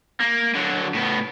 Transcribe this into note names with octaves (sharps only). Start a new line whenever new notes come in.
A#3
D3 F#3
A2 B3